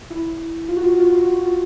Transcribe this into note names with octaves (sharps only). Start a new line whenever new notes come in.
E4
F4
F#4
F4
F#4
F4
F#4
F4
F#4
F4
F#4
F4